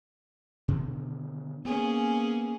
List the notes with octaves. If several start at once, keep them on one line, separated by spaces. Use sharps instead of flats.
B2 D3 D#3
A#3 B3 C#4 G#4